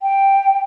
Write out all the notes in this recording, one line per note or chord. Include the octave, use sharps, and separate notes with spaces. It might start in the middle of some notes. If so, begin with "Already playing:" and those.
G5